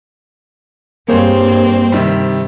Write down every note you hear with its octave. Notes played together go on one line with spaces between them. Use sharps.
G2 A#3 C4 G#4 C5 C#5
C3 D#3 G3